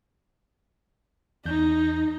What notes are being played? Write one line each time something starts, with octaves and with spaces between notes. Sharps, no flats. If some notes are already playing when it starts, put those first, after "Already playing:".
E2 D#4 G6